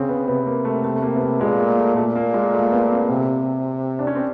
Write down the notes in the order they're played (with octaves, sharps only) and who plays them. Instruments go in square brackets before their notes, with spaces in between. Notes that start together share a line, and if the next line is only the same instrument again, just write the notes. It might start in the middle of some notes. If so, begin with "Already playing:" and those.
Already playing: [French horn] C#3 [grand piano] C4
[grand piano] B3
[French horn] C3 [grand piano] B3
[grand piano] A#3
A3
A3
A3
A#3
B3
A#3
[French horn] A#2 [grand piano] G#3
[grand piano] A3
A3
[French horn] A#2 [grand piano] A3
[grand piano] A#3
G#3
A3
B3
C4
[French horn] C3
[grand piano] D4
C#4
C4